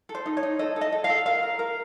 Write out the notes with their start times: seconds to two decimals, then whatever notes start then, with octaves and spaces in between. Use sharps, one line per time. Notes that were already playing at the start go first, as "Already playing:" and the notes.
0.09 A4
0.15 C5
0.26 D#4
0.37 C#5
0.43 D#4
0.59 A4 D#5
0.76 A4
0.81 D#5
0.92 A4
1.04 F5
1.09 A4
1.26 A#4 F5
1.43 A#4
1.59 A#4